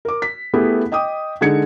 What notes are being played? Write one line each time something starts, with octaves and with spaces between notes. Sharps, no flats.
A#4 D6
B6
A3 B3 E4 G4 G#4
D#5 G5 D6 D#6
D3 G#3 D#4 G#6 C#7